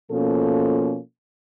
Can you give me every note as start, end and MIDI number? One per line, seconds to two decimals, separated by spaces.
0.11 0.98 47
0.11 0.98 53
0.11 0.98 58
0.11 0.98 61
0.11 0.98 69